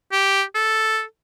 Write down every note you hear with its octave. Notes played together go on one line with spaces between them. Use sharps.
G4
A4